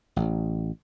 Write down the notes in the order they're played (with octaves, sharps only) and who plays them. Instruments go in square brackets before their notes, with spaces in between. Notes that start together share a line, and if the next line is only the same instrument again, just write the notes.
[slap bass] A1